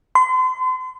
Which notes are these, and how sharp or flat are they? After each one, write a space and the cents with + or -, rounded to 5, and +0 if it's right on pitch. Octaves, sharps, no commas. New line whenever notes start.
C6 -40